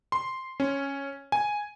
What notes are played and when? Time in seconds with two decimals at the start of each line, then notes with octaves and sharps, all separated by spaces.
0.12 C6
0.60 C#4
1.32 G#5